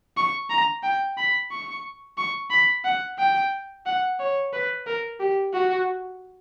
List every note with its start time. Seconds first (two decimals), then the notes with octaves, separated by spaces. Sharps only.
0.17 C#6
0.51 A#5
0.83 G5
1.18 B5
1.51 C#6
2.18 C#6
2.51 B5
2.84 F#5
3.19 G5
3.86 F#5
4.20 C#5
4.53 B4
4.87 A#4
5.20 G4
5.54 F#4